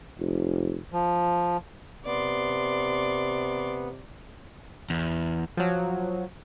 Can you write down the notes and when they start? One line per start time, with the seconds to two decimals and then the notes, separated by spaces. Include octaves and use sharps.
0.19 F1
0.92 F3
2.06 C3 B3 D5 C6
4.90 E2
5.57 F3 F#3